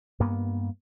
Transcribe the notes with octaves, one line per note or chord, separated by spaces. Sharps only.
G2 A#3 B3